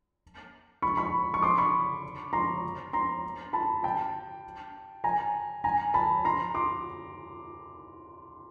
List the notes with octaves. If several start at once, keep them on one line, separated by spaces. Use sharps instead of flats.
B5 C#6
B5 C#6
C#6
C6 D6
B5 C#6
A#5 C6
A#5 C6
A5 B5
G5 A5
G#5 A#5
G#5 A#5
A5 B5
A#5 C6
C6 D6